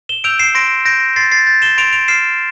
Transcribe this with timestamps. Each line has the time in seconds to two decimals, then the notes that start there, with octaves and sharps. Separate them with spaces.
0.09 E7 G7
0.24 E6 G6 D7 F7
0.39 C7 E7
0.55 C6 A#6 D7
0.85 G6 A#6 D7
1.16 C6 A6 C7
1.31 A6 C7
1.47 G6 A6
1.62 E7 G7
1.77 C6 D7 F7
1.93 D7 F7
2.08 F6 C7 E7